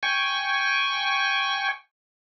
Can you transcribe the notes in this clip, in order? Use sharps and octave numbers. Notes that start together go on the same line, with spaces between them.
G5 G#5 C#6